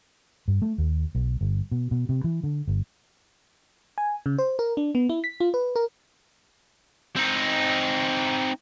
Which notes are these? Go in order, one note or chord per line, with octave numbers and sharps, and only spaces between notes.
G2
A3
D#2
B1
G1
B2
B2
C3
E3
D3
G1
G#5
C#3
C5
A#4
D4
B3
E4
B6
F4
B4
A#4
C4 D#4